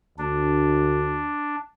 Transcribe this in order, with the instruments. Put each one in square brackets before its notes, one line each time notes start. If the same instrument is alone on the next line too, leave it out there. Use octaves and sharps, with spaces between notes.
[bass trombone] D2 [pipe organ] D4